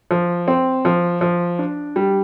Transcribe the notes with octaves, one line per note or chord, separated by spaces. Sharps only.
F3
C4
F3
F3
D4
G3